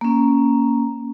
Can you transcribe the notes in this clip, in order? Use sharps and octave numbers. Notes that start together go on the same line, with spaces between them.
A#3 C#4